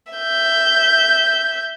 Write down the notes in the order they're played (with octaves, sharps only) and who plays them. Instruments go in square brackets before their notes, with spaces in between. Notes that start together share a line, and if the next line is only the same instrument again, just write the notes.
[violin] E5 G6